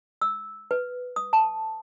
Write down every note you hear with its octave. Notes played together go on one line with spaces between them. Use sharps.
E6
B4
D#6
A5